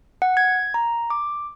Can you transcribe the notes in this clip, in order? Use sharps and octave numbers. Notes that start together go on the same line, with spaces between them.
F#5
G#6
A#5
D6